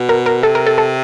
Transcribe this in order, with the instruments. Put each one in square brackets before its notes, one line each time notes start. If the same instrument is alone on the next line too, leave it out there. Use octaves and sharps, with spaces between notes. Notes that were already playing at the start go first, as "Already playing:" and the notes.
Already playing: [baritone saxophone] B2
[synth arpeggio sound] A#4
A#4
[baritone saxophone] C3 [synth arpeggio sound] A4
[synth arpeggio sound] A#4
A4
A4